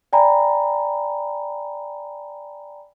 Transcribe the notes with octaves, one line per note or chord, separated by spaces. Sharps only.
D5 G5 G#5 A#5 B5